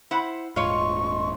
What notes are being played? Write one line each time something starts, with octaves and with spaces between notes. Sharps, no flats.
E4 C5 F#5
D#1 G#2 F4 C#5 D#5 C6 C#6